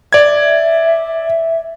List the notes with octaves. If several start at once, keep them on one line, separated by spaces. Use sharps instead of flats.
D5 E5 G#6